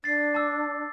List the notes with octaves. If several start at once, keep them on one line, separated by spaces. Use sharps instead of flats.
D4 A6 C7
A5 D6 E6